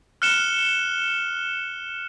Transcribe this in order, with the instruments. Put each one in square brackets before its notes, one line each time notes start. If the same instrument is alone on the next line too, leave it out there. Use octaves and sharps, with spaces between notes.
[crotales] F6 F#6 C#7 E7 G7